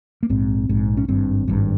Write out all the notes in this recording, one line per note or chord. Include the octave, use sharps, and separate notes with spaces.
A#3
A#1 G#2 C4
A#1 G#2
C#4
G#1 G2 C4
G#1 G2